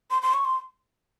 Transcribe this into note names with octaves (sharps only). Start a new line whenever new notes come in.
C6
C6
C#6
C6